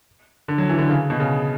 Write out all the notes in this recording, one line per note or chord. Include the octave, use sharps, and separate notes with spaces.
D3
F#3
E3
D3
C#3
B2
C#3